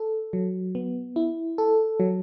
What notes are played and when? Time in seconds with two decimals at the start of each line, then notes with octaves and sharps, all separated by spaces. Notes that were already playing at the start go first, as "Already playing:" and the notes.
Already playing: A4
0.33 F#3
0.75 B3
1.16 E4
1.58 A4
2.00 F#3